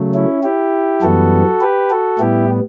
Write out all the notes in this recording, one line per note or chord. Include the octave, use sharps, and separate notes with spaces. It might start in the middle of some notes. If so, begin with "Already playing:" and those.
Already playing: C#3 F#3 A3
C#4 E4
E4 G4
F#2 E3 G3 B3 F#4 A4
G4 B4
F#4 A4
A2 G3 B3 E4 G4